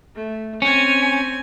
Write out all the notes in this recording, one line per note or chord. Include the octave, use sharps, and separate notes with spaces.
A3
C4 C#4 G#5